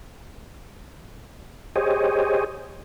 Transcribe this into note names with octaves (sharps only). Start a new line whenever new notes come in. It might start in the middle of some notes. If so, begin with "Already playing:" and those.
G4 G#4 C5 C#5 D#5